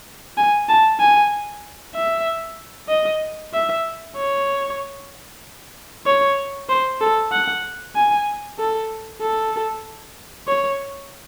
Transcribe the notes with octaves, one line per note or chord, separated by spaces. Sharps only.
G#5
A5
G#5
E5
D#5
E5
C#5
C#5
C5
A4
F#5
G#5
A4
A4
C#5